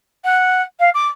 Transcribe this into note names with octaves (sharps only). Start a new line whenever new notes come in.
F#5
F5
D6